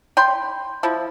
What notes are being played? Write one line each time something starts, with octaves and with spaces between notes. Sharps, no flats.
G5 B5 C6
F3 E4